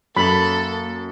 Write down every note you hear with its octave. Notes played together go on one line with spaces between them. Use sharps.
F#2 A#3 A4 B5